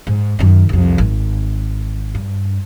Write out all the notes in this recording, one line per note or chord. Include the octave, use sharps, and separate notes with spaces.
G#2
F#2 D#3
C2 F2
G#1
G2